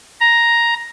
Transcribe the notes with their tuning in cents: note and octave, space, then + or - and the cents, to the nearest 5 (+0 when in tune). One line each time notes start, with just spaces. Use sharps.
A#5 +5